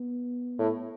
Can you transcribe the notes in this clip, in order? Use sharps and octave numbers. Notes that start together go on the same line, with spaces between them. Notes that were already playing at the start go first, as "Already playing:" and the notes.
Already playing: B3
A2